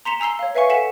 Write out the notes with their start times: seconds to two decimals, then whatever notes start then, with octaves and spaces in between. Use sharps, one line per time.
0.05 A#5 C6 B6 C#7 E7 F7
0.20 G#5 A#5 E6 C7 G7
0.39 C#5 F5
0.55 B4 E5 F5 G#5 C#6 C#7
0.69 A4 F5 F#5 G#5 B6 E7